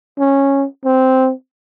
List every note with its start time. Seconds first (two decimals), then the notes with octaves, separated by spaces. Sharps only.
0.19 C#4
0.85 C4